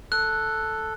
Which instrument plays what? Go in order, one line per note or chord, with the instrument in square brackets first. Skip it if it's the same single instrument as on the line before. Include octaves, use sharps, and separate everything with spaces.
[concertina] A4 [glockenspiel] F#6